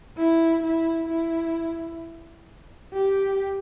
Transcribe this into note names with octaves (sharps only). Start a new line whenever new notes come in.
E4
E4
E4
G4